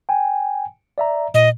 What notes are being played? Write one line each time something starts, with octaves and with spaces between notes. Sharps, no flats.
G5 G#5
D5 E5 A#5
A#2 D#5